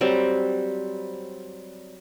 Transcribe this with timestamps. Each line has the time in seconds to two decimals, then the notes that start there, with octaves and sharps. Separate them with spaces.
0.01 F#3 G3 C4 C5